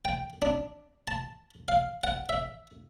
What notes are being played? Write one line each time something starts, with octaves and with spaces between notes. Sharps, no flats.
G5
D4
A5
F5
F#5
E5